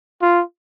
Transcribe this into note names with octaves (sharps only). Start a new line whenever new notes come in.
F4